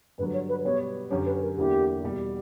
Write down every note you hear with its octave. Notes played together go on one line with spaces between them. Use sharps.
G2 D3 F#3 B4
C#5
B4
B2 G3 B3 C#5
F#2 D3 F#3 C#4 G4 C#5
B4
A#4
E2 D3 A#3 E4 G4
E2 B2 G3